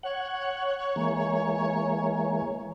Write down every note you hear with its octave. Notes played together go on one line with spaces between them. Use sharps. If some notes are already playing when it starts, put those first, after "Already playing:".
C#5 F#5
E3 G#3 A#3